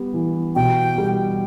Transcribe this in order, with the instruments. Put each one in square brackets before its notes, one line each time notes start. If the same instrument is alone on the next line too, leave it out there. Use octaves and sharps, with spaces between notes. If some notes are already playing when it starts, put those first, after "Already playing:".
Already playing: [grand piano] G3 B3
E3
[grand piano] B2 [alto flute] G5
[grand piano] G3